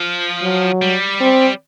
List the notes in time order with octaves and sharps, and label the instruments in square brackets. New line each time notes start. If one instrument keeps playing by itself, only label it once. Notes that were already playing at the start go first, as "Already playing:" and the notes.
Already playing: [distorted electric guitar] F3
[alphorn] F#3
[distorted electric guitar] G3
[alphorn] C4